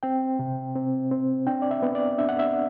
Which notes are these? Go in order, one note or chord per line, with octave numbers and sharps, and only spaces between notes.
C4 G5
C3
C4
C4
D4 G5
D5
E5
B3
D5
D4 E5
F#5
E5